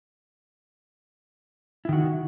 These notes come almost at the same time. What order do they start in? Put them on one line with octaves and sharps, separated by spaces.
E4 D#3 F#4